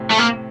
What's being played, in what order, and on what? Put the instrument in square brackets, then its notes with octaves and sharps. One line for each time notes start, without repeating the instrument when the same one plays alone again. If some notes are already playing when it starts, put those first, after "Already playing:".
Already playing: [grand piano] A2 C3
[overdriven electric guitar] A3
A#3